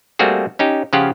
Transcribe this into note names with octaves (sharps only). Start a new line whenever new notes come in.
G3 A3 A#3 C4 F#4 G#4
C#4 D#4 G4
C#3 F3 C#4 F4 G4 F#5